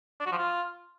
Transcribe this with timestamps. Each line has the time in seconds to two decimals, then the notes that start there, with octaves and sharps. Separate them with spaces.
0.20 D4
0.26 F#4
0.32 F3
0.38 F4